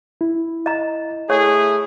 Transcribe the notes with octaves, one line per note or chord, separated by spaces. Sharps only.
E4
D#5 A#5
A3 E4 G#4 C#5 C#6